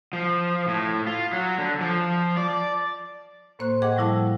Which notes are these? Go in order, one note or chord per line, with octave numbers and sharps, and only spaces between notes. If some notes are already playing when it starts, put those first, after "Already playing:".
F3
A2
F4
F#3
D3
F3
D5
A2 A#3 C5 C6 F#6
G#4 D#5 F#5 G5 D6
A2 F3 G3 E4 F5 A5